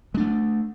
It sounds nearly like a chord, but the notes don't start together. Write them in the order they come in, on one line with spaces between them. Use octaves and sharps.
G#3 D4 A3